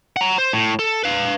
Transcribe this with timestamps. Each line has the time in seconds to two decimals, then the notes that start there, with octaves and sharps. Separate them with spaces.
0.16 F#5 A#5
0.38 C5
0.53 A2
0.79 A4
1.03 B4 F5